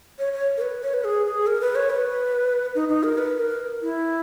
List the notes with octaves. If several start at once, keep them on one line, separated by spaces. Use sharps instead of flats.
C#5
C#5
A#4
B4
C#5
B4
G#4
G#4
A#4
B4
C#5
B4
D#4
D#4
A#4
B4
A#4
E4